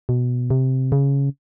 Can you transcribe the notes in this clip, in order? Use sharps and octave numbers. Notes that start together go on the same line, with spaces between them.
B2
C3
C#3